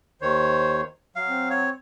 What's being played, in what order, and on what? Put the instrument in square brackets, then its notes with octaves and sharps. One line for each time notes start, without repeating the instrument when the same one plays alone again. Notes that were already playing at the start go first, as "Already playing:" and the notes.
[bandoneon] D#2 D#3 C#5 [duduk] C5
[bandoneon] F#3 [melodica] F5
[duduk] C4
[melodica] C#5